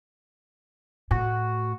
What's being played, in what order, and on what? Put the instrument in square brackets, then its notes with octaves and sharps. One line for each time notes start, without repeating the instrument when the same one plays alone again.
[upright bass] A2 [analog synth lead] F#4